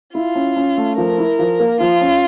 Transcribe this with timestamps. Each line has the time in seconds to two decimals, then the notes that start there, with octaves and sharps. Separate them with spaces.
0.15 E4 F4
0.35 C#4
0.56 C#4
0.77 A3
0.98 F3 A#4
1.18 E4
1.39 F3
1.60 A#3
1.80 F3 F4
2.01 C#4